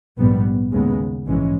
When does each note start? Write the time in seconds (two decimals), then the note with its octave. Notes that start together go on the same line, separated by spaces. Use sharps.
0.18 A#1 G#2 G3 B3
0.72 D#2 C#3 G#3 B3
1.27 A#1 G#2 E3 G#3 C#4